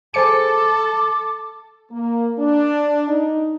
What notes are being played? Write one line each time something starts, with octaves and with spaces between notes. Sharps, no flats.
G#4 A4 C5 D6 C#7
A#3
D4
D#4